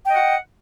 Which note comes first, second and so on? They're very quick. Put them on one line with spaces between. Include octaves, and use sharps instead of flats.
G5 D#5 F#5